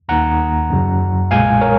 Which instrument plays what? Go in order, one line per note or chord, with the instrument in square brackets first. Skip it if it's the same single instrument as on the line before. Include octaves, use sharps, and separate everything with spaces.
[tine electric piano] D#2 D#3 A#3 D#4 F#5 A#5
F#2 C#3 F#3
B1 A#2 G#3 F5 G#5
A#4 C#5